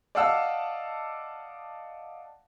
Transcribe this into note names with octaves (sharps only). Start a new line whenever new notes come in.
D5 D#5 F5 F#5 A5 E6